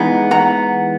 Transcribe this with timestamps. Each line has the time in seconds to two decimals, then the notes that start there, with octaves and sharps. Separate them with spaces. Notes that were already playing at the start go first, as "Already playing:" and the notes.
Already playing: E3 G#3 B3 D#4 F#5 A#5
0.31 F#5 A#5